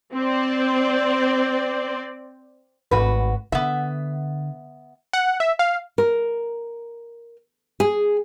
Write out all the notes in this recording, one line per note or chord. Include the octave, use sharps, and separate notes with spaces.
C4 C5 D5
G#1 A3 F#4 B4
D3 B3 E5
F#5
E5
F5
A#4
G#4